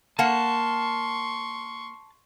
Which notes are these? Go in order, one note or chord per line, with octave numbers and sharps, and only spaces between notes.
A#3 F#5 A5 C6 C#6